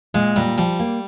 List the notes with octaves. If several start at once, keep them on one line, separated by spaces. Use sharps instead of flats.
A#2 G#3
A#2 G3
F3 G3
A#3